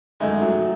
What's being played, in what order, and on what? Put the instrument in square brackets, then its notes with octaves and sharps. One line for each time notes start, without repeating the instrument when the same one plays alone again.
[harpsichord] F#2 D#3 A3 D#4 [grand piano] G#3
[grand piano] F#3